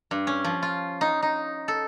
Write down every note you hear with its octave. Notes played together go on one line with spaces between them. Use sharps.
G2
C#4
F3
F4
D#4
D#4
A4